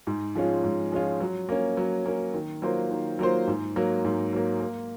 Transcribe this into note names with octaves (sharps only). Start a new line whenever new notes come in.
G#2
F3 G#3 C#4 F4
G#2
F3 G#3 C#4 F4
F#3
A#3 C#4
F#3
A#3 C#4
D#3
F#3 A#3 F4 C5
D#3
F#3 A#3 F4 C5
G#2
F#3 A#3
G#2
F#3 A#3
A#3